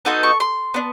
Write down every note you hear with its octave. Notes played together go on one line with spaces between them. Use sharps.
B3 D#4 F#4 A4 C6
C#6
C6
B3 D4